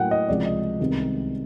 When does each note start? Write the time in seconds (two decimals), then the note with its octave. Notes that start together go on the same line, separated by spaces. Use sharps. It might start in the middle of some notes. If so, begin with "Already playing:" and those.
Already playing: A2 F#3 A#3 F#5 G5
0.11 D#5
0.28 C#2 C3 F3 G#3 D5
0.46 D#5
0.80 C2 C3 D#3 G#3 B3